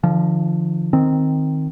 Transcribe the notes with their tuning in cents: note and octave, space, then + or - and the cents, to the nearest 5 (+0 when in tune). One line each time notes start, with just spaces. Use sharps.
D3 +25 F3 -20
D#3 +0 C4 +0